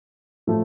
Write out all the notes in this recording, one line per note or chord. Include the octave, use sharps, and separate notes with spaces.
A2 F3 A3